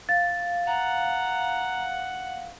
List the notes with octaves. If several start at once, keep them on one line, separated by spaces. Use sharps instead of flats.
F5 A6
F#5 A#5